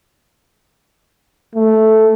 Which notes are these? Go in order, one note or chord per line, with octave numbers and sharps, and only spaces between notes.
A3